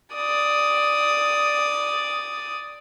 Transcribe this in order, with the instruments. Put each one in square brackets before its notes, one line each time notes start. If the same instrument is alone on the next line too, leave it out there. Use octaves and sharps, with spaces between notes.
[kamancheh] D5 D#6